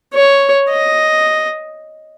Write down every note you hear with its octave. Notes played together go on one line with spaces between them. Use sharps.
C#5
D#5